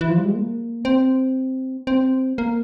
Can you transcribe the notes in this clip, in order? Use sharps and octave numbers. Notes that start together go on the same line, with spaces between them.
E3
F3
G3
G#3
A#3
C4
C4
A#3